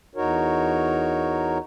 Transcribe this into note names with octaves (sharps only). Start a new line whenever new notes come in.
E2 D#4 F#4 A#4 C#5